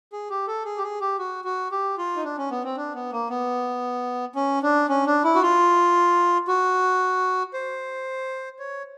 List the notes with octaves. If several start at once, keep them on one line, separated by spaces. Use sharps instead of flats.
G#4
G4
A4
G#4
G4
G#4
G4
F#4
F#4
G4
F4
D#4
D4
C#4
B3
C4
D4
B3
A#3
B3
C#4
D4
C#4
D4
E4
F#4
F4
F#4
C5
C#5